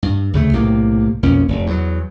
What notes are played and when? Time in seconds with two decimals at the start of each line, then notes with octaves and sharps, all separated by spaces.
0.03 G2
0.33 D2 C#3 A3
0.53 B1 A2 C3 A#3
1.23 B1 F2 A#3 C#4
1.48 F1
1.66 E2 G2 F#3